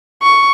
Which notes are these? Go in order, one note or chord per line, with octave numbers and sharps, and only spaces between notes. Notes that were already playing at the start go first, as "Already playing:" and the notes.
C#6